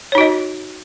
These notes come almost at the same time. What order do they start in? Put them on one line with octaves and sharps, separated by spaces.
C#5 D#4 F#4 D#5